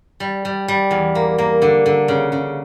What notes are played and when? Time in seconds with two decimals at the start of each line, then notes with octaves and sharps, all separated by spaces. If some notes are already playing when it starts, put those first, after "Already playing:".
0.20 G3
0.45 G3
0.68 G3
0.91 E2
1.15 A#3
1.38 A#3
1.62 D3
1.86 D3
2.08 C#3
2.32 C#3